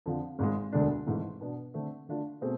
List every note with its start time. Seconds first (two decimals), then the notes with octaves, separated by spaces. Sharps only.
0.06 F2 D3 F3
0.39 G#1 G#2 G#3
0.72 E1 D2 D3 G#3 D4
1.07 G#1 G#2 E3 A3
1.41 B2 B3 D4
1.74 D3 A3 C4
2.08 D3 A3 D4 F4
2.41 B2 A3 C4 G#4